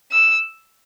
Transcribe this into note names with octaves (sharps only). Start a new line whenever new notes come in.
E6